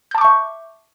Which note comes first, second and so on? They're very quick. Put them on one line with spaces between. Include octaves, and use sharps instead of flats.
G6 A5 D6 C#6 E5